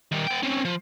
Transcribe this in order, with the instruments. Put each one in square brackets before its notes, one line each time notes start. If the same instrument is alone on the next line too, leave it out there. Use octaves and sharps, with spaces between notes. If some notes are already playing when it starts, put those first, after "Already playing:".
[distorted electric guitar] D#3 G3
B3 G5
C4 C#4
F3